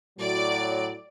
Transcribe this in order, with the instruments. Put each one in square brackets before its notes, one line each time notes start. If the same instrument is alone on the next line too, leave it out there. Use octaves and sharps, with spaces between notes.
[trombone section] A2 F#3 [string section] D5